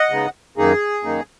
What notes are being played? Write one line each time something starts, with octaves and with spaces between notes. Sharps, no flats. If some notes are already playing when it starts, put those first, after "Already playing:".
Already playing: D#5 F#5
C#3 G#3 B3 D#4
F#2 D#3 A#3 D#4 G#4
F#2 D#3 A#3 D#4